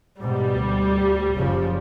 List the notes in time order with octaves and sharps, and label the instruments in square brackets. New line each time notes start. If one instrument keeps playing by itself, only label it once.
[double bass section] G#2 B2 [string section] G3
[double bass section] D2
F#1 C#3 F3